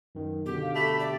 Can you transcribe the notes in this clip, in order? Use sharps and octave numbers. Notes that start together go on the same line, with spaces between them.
F#2 D#3
B2 D3 G4
F5
A3 G4 B5
D5